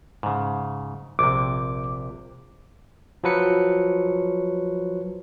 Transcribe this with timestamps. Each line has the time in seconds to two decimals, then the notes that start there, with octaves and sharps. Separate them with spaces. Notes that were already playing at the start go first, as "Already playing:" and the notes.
0.23 G#2 C#3
1.19 A#1 C3 D6
3.24 F3 F#3 B4 C#7